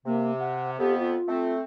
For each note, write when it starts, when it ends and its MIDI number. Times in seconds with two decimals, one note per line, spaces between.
0.06 0.77 48
0.06 0.32 58
0.39 0.70 78
0.78 1.16 41
0.78 1.16 59
0.78 0.94 67
0.99 1.53 65
1.28 1.61 57
1.28 1.61 60